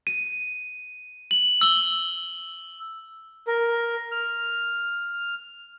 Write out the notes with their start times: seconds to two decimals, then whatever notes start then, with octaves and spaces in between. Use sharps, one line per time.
0.07 D#7
1.31 F#7
1.61 E6 G7
3.47 A#4
4.11 F6